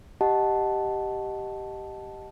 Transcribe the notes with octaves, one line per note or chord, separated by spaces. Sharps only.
G4 D#5 F#5 A5